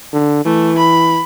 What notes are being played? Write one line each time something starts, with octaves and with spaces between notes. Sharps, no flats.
D3
E3 A3
B5